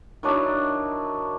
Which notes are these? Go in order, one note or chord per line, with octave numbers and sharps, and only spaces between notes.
D#3 F#3 D4 E4